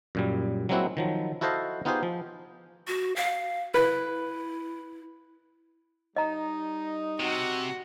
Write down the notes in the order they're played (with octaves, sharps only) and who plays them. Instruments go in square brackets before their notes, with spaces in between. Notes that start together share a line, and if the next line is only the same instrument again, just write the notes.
[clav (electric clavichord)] F#2 A#2 G3
F#3 G#3 A#3 C4 E4 F#4
D#3 F3 F#3
E4 F#4 A4 C5 D#5 F5
B3 D#4 F4 G4 G#4 C5
F3
[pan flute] F#4
F5
[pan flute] E4 [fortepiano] B4
[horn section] G3 D#4 [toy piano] D#5 A#5
[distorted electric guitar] C3 [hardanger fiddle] F#4 F#5